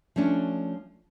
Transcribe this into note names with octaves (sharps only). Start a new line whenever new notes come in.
F3 A3 C#4 D4